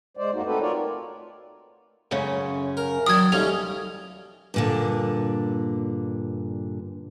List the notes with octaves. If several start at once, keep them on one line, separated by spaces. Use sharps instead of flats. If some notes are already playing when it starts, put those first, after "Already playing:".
G#3 C5 D5
F2 A3 A#3 D#4 F#4
A3 C4 D#4 F#4 A4 B4
F4 A#4 C#5 D5
F#2 C#3 C#4
A#4
D#3 F#3 D5 D#6 G#6
D#2 G3 A3 C#4 F7
G2 A#2 D3